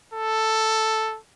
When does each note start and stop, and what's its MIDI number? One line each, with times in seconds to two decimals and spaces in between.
0.14 1.18 69